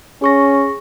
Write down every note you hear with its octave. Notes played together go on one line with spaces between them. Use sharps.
C#4 G#4 C#6 A#6